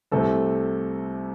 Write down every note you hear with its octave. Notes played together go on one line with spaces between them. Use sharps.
C2 C3 A3 A4